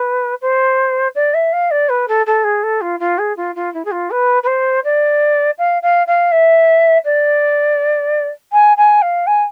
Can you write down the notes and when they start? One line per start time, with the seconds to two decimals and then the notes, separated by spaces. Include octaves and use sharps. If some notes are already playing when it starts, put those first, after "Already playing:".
Already playing: B4
0.42 C5
1.15 D5
1.34 E5
1.53 F5
1.71 D5
1.89 B4
2.08 A4
2.26 A4
2.44 G#4
2.63 A4
2.81 F4
3.00 F4
3.18 G#4
3.37 F4
3.56 F4
3.74 E4
3.85 G#4
3.91 F4
4.11 B4
4.43 B4
4.47 C5
4.84 D5
5.58 F5
5.82 F5
6.07 F5
6.32 E5
7.05 D5
8.53 G#5
8.77 G#5
9.02 F5
9.27 G#5